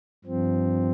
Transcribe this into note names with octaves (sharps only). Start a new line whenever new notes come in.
G2 F3 C4